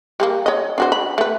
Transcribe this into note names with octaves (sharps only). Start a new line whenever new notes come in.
G3 G#3 A#3
C#5 D#5
D4 F#4 C5
B5
A3 B4